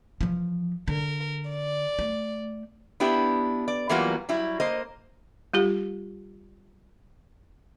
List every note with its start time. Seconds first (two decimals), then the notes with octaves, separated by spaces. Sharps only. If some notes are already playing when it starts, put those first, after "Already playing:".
0.21 E3 F3
0.88 D3 A#4
1.50 D5
1.99 A3
3.00 B3 D4 E4 G4
3.68 D5
3.89 E3 F#3 G3 A#3 B3 F4
4.29 F#3 G3 E4
4.60 A#3 C5 D#5
5.54 G3 F4 G4